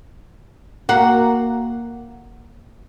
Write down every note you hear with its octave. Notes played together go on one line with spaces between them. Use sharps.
A#3 F#4